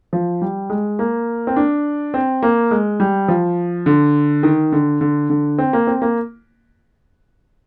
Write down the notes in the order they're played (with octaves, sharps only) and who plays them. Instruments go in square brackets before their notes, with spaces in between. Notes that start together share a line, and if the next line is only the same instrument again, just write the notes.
[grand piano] F3
G3
G#3
A#3
C4
D4
C4
A#3
G#3
G3
F3
D3
D#3
D3
D3
D3
C4
A#3
C4
A#3